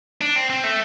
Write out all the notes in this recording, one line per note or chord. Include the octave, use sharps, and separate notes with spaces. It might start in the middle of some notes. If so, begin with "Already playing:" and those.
D4
C4
C4
A3